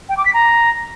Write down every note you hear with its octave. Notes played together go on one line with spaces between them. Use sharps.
G5
D6
B6
A#5